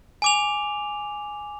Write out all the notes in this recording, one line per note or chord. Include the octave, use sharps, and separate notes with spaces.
G#5 D6 F7